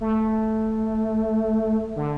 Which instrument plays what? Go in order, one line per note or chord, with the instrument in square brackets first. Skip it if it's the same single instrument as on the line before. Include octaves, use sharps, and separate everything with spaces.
[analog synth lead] A3
D3